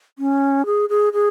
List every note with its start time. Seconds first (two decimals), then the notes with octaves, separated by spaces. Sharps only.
0.19 C#4
0.66 G#4
0.89 G#4
1.13 G#4